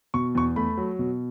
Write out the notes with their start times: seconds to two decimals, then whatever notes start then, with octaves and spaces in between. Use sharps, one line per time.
0.14 B2 C#6
0.35 E2 C#6
0.56 A3 B5
0.77 F#3
0.99 B2